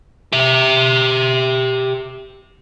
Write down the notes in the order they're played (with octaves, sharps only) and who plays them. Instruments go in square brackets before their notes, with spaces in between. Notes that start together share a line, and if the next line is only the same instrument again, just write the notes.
[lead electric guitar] G4 E5